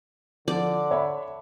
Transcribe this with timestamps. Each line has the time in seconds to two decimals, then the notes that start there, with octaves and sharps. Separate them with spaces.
0.48 D3 F3 D5
0.91 C#5 E5 B5